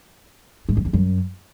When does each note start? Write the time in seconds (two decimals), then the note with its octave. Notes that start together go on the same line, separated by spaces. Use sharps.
0.69 G#2
0.77 F2
0.85 E2
0.93 F#2